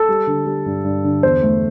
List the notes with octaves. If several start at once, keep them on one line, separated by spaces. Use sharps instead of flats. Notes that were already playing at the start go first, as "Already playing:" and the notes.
Already playing: A4
G3
D3
G3
G2
G2
D3
E2 C5
A3